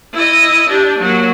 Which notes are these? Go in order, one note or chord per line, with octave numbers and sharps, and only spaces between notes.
E4 D#5
D4 G4
F#3 A#3